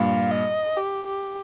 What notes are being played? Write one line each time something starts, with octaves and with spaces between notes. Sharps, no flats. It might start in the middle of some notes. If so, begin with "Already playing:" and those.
Already playing: G2 A#2 F5
D#5
G4
G4